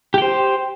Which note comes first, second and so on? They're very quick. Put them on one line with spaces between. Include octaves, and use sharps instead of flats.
G4 G5 C5